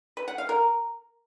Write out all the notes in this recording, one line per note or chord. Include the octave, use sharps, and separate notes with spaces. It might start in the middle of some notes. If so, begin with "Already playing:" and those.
B4
F#5
F5
A#4